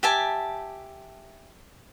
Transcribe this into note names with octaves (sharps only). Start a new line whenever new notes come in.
G4 E5 G#5 A5